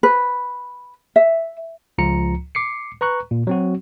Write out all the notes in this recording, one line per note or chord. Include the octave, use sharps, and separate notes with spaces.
B4
E5
C#2 F3 F4 A#5 C#7
D6 C7 C#7
B4 A#5 C#6 F#6
A#2
F#3 C4 F#4